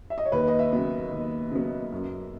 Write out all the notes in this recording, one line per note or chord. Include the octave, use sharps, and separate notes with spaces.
E5
D#5
C#5
D#2 B4
D#5
E5
C#3 F#3 B3
D#2
C#3 F#3 B3
F#2